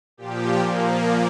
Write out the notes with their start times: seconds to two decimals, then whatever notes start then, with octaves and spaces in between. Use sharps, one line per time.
0.17 A#2 F3 G4
0.59 A#2 F3 A#3